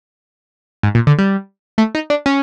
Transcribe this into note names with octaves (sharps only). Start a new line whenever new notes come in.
G#2
A#2
D3
G3
A3
D#4
D4
C#4